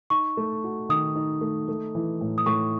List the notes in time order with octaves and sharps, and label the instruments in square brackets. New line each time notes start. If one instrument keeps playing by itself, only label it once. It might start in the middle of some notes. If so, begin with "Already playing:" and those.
[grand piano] D#4 [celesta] C#6
[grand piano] A3
F#4
[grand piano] D#3 [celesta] D#6
[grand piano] D#4
A3
A3
E3
A2
[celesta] D#6
[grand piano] A2 [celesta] C#6